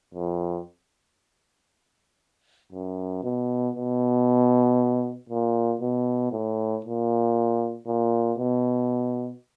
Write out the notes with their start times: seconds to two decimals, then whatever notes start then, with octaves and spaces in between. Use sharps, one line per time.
0.14 F2
2.72 F#2
3.23 B2
3.76 B2
5.29 A#2
5.81 B2
6.32 A2
6.85 A#2
7.87 A#2
8.38 B2